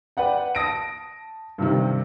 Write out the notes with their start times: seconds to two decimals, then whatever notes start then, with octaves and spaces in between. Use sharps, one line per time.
0.17 B4 D5 F#5 G5
0.55 A5 D#6 A#6 D7
1.58 G2 C3 D#3